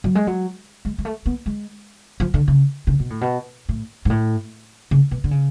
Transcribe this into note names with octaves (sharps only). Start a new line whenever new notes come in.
F#3
G#3
F#3
G#3
G#3
A3
B3
G#3
F3
D3
C#3
C#3
B2
A2
B2
A2
G#2
A2
C#3
B2
D3
C#3